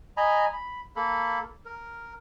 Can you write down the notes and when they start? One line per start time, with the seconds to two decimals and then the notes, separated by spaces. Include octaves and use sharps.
0.17 D#5 G#5 A#5 B5
0.53 B5
0.96 A#3 A4 B5
1.65 A#4